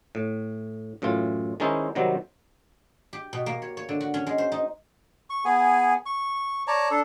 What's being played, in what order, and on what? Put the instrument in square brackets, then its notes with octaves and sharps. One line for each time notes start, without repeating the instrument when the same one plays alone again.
[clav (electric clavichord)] A2
F#2 A2 E3 F4
D#3 G#3 C#4 D#4 E4 C5
C3 D#3 F#3 G3 C4
[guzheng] G4
B2
A#3
C#5
C#5
D3
F#4
C#4
G#3
C5
D#4
[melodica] C#6
B3 G#4 G#5
C#6
C#5 D5 A5 A#5
D4 A4